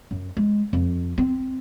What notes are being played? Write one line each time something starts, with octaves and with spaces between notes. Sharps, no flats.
F#2
G#3
F2
C4